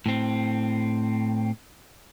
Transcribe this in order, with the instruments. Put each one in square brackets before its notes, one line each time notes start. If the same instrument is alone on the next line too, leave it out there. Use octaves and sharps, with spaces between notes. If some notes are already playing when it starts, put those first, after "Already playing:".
[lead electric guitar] A2 C4